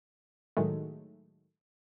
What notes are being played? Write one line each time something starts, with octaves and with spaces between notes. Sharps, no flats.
A2 D#3 F#3 G#3 A3